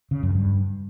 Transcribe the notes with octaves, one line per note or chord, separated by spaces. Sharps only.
C#3
F#2
G2